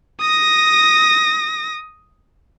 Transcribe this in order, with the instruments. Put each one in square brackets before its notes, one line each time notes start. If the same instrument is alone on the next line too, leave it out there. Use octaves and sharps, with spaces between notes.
[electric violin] D#6 A#6